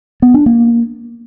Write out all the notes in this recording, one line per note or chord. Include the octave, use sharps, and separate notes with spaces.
B3
D4
A#3